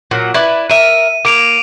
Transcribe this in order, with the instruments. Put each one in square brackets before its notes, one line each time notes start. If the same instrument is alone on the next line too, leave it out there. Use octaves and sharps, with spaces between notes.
[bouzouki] A#2 F#3
E4 B4 D5
[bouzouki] A#4 E5 [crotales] D#7
[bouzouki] A#3 [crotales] D6 D7 F7